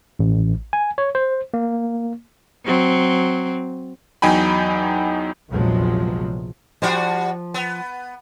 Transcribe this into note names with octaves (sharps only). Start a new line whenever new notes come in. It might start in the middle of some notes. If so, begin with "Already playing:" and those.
A1
G#5
C#5
C5
A#3
F#3 C4
E2 F#3 D#4 G5 G#5 B5
A#1 E2 C3 F3 F#3 G#3
F3 G3 D4 F#4
B3